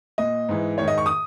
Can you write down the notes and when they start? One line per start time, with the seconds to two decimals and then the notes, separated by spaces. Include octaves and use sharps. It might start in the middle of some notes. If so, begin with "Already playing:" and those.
0.18 A#2 D#5
0.49 G#2 E3
0.78 G#2 D#3 C#5
0.88 D#5
0.98 C#6
1.06 D#6